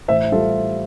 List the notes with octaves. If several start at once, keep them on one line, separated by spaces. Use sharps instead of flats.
A1 C5 E5
G3 F4 A4